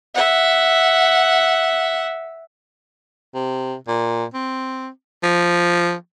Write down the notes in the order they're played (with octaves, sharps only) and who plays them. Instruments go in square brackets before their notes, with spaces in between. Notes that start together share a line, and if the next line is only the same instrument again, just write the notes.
[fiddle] E5 F#5
[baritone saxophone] C3
A#2
C4
F3